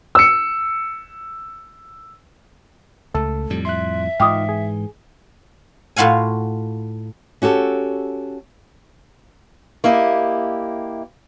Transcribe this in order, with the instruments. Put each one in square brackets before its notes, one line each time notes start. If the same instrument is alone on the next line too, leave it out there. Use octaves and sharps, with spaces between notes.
[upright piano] E6 C#7
[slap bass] C#2 [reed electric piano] A3 A4
[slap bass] F2 A2 G3
[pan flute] E5 [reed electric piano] C6 F#6
[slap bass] G#2 E3 [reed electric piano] D#4 F4 F5 [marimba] G5 D6 D#6
[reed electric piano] G#4
[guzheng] A2 F4 F#4 F5 G#5
[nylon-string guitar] C#4 F#4 G4 A4
[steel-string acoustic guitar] A#3 E4 G4 D#5